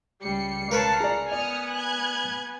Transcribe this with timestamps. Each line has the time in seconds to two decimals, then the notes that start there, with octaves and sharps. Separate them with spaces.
0.22 C#2 G3 C7 C#7
0.71 A#4 B4 C#5 F5 A5
1.00 G#4 D5 A#5
1.31 B3 D5 G#5 D#6 F6 C#7
1.72 F#6 G#6